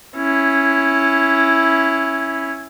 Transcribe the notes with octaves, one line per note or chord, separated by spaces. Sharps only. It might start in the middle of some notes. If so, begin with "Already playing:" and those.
C#4 E4